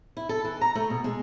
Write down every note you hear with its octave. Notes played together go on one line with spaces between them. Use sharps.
E4
A4
E3
A#5
A3
B2
G#3